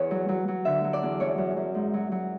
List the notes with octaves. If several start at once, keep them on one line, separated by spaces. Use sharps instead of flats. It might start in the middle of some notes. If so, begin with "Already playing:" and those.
Already playing: E2 B4 C#5
F#3
F#3
F#3
D3 E5
F#3
D5
E2
F#2 C#5
F#2
F#2
G#2
F#3
F#3